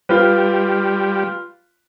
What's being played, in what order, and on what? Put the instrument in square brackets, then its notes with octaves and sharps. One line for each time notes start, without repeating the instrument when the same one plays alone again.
[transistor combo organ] G3 [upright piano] F4 B4